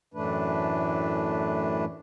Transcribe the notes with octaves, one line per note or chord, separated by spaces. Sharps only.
F#2 A2 E3 A3 D4 B4